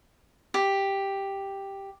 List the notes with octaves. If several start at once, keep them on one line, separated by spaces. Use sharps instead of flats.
G4